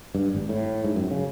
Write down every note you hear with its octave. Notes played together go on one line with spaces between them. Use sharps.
G2
G#1
A2
G#2
F#2
C#3